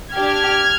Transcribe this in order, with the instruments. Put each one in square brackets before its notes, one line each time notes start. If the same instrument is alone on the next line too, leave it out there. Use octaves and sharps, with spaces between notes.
[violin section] D4 G4 F6 G#6